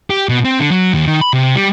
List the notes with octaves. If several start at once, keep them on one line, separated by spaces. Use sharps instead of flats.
G4
B2
C4
D3
F#3
D#2
D#3
B5
C3
G3